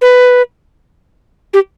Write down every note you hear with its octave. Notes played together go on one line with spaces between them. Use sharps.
B4
G4